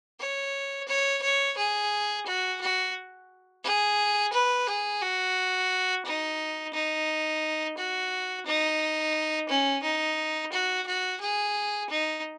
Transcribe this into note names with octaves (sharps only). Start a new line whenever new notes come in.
C#5
C#5
C#5
G#4
F#4
F#4
G#4
B4
G#4
F#4
D#4
D#4
F#4
D#4
C#4
D#4
F#4
F#4
G#4
D#4